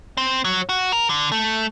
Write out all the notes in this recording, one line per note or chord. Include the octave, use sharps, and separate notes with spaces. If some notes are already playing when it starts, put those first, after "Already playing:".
C4
F#3
F#4
A#4
D3
A3